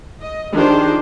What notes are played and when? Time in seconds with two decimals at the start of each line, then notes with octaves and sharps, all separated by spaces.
0.22 D#5
0.54 D#3 F3 D4 G4 G#4 C5